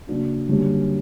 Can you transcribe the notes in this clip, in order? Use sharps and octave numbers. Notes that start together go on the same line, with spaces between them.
C#3 F#3 A#3 D4 F#4
F#2 D3 G3 A#3 C#4